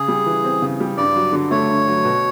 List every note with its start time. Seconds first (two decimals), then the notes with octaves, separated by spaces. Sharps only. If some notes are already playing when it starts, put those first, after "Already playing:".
Already playing: C#3 G#4
0.08 G3
0.26 E3
0.44 C4
0.62 C#3
0.80 G3
0.97 G2 D5
1.15 F#3
1.33 D3
1.51 A3 C#5
1.68 G2
1.87 F#3
2.05 B2